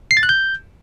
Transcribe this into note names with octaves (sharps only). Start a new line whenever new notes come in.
C7
A6
F#6
G6